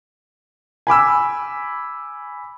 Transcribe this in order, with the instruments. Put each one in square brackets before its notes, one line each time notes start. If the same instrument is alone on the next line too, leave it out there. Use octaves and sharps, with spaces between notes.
[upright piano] G#5 B5 D6 E6